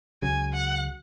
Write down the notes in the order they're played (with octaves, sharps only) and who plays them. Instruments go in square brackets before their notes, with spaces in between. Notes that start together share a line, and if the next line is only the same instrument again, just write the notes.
[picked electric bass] C#2 C#3 F#3 [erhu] G#5
[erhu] F#5